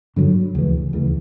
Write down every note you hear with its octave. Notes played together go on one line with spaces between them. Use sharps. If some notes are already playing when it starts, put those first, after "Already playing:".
G2 D3 F#3
D2 C#3 E3
D2 C#3 E3